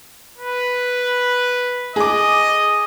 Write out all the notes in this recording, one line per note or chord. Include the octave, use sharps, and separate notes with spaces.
B4
G#4 D#5 D6